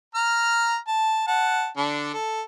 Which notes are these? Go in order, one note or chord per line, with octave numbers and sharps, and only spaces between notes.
A#5 F6
A5
F#5 A5
D3 D4
A4